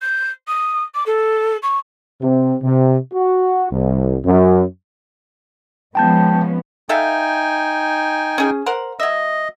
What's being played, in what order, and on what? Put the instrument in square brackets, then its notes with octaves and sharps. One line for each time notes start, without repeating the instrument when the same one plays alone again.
[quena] G6
D#6
D6
A4
C#6
[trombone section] C3
C3
F#4
C2
F#2
[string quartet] F3 [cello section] G#3 B3 C#4 [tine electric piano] G5 A5 G6
[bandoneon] D#4 G5 G#5 [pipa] A4 E5 F5
[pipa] C#4 G#4
A#4 C5 F#5
[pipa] F#3 E5 [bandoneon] D#5